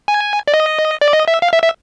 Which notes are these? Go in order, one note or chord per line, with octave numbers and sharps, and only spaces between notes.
G#5
D5
D#5
D5
D#5
E5
F5
E5
E5